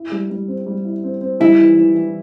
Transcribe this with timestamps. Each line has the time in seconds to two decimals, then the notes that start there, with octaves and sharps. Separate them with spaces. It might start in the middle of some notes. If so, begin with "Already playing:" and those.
Already playing: E4
0.11 G3
0.30 G3
0.48 C4
0.67 G3
0.85 E4
1.04 C4
1.21 C4
1.40 G3 E4
1.59 E3
1.77 E3
1.95 E3